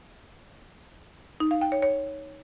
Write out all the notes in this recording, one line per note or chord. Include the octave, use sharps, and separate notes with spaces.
D#4
F5
G5
C#5
C#5